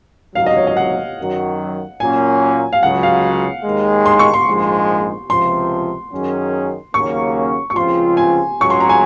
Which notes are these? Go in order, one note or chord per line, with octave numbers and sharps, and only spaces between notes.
C#2 C3 D#3 F#3 F5
D#5
C#5
D#5
F#5
F#2 D#3 F#3
A#2 F#3 A#3 C#4 G#5
F5
C#2 C#3 F#3 F#5
F5
D#2 D#3 G#3
C6
C#6
C6
A#1 G#2 F3 G#3
C#2 C3 F3 C6
F#2 D#3 F#3 C#4 G#4
D#2 C#3 F#3 A#3 C#4 C#6
C#6
C#2 C#3 F3 C4 F4 C6
G#5
C#2 C#3 F#3 C#6
C6
A#5
G#5